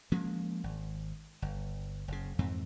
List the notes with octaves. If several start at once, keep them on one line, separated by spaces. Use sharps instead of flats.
F3 G#3 A#3 C#4
G#1
G1
F#1 C#3
F2 G#2 E3 C4